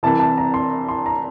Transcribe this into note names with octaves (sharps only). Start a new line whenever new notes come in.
C2 C3 E3 A5
A5
A#5
C6
C6
A#5